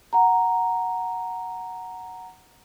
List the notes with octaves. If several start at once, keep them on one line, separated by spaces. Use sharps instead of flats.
F#5 A#5